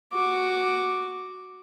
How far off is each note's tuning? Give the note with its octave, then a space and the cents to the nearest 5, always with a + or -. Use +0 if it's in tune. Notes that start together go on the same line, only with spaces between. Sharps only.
F#4 +0 D6 +0